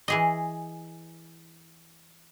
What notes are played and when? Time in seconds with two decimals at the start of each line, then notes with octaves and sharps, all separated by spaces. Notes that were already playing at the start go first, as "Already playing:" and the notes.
0.08 E3 G#4 D#5